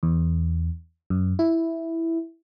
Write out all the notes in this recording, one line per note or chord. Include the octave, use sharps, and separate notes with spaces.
E2
F#2
E4